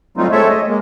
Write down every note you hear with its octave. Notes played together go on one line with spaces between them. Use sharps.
F#3 G3 A3 C4 D#4 F4
G#3 A3 C4 A4 C#5 E5
D#5
G#3 A#3